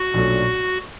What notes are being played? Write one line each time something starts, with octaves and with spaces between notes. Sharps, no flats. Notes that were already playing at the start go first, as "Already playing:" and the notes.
Already playing: F#4
B1 A#2 F#3 A3 D4